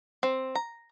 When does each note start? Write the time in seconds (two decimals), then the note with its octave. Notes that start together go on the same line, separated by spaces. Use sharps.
0.23 C4
0.55 A#5